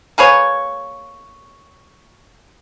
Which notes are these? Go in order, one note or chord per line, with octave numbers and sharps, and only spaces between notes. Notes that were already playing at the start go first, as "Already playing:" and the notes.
A#3 G#4 B4 C#5